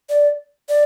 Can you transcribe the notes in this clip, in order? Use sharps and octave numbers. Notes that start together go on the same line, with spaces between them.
D5
D5